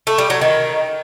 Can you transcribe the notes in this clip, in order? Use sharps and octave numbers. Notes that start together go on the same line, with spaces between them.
A3
G3
F#3
D#3